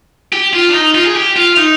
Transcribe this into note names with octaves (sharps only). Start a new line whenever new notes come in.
G4
F4
D4
D#4
F4
G#4
G4
F4
D#4